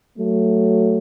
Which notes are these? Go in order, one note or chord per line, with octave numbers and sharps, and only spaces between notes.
F#3 A3